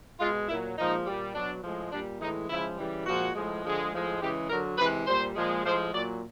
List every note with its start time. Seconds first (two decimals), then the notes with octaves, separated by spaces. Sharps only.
0.20 B2 G#3 F4
0.49 A#2 F#3 E4
0.77 A#2 F3 G#3 D#4
1.06 A#2 G3
1.34 B2 F#3 D4
1.64 A2 F3 G#3
1.92 A#2 G3 D4
2.20 A2 E3 G#3 D#4
2.49 C#3 F3 G#3 E4
2.77 C#3 E3 G3
3.06 A#2 F3 G#3 F#4
3.35 A2 F3 G#3
3.64 D3 F3 G#3
3.92 A2 F3 G#3
4.21 C#3 E3 G#3 G4
4.50 D3 F#3 A#4
4.78 C3 E3 G#3 B4
5.06 A#2 G3 C5
5.35 A#2 F3 G#3
5.63 A2 F3 G#3 C5
5.93 A#2 F#3 D5